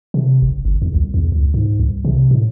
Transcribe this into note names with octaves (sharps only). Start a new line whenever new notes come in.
C3
F#1
G1
E2
C2
E2
C#2
G#2
C2
C3
A2